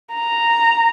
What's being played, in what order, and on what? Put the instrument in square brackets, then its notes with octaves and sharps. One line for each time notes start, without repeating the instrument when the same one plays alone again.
[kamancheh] A#5